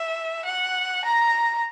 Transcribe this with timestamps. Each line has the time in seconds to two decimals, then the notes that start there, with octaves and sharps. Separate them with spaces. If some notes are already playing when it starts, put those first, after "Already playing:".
Already playing: E5
0.45 F#5
1.05 A#5